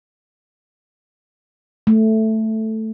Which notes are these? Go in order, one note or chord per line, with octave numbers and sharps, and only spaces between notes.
A3